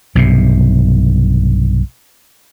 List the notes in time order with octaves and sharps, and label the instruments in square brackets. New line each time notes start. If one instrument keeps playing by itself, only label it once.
[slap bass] B1 G2 C3